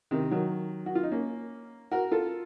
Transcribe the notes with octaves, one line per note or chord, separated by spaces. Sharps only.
C3 D#3
D#3 F#3
F#4
F4
D#4
A#3 C#4
F#4 A#4
F4 A4